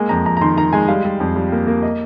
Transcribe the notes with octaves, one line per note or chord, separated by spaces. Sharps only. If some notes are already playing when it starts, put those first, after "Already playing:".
Already playing: G#3 A#3 G#5
F2 A#5
F2 A#5
A#5
D#3 C6
D#3 A#5
G#3 G#5
G3 F5
G3
F2
G3
A#3
A#3
D#5